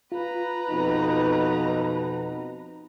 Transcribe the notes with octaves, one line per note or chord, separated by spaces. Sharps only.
F4 B4 A#5
F2 B2 D#4